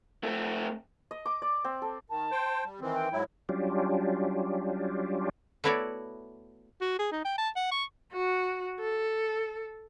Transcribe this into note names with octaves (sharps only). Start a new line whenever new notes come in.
A3 C4
D#5
D6
D5
C4
A4
D#3 A5
C5 G5
G3
D#3 E3 C4
G5
G#2 F#3 E4
F#3 G3 C#4 D4 F4 G4
A3 B3 E4 F#4 C#5 D5
F#4
G#4
D#4
G5
A5
F#5
C#6
F#4
A4